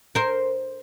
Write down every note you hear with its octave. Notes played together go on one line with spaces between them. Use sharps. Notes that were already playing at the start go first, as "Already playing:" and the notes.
A#4 C5